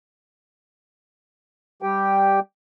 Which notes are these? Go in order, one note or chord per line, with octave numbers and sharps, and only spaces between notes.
G3 G4 G5